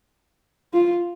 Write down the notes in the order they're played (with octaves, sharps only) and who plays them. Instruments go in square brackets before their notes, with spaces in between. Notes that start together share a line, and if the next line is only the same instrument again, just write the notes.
[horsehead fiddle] F4